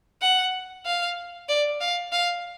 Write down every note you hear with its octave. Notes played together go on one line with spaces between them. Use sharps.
F#5
F5
D5
F5
F5